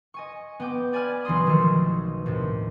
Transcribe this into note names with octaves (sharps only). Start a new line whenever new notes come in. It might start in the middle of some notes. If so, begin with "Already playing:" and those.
D#5 G#5 C#6
B3 G5 D6
D5 G#5 B5 D6 F6 G#6
B1 E3 B5 C6 D#6
D#3 F3 G#3 A3 A4
D#2 A2 C3